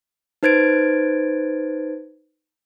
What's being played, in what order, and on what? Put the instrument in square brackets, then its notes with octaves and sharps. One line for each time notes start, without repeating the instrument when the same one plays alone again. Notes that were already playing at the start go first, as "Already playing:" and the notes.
[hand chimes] D#4 B4 C5 G#6 A6 D7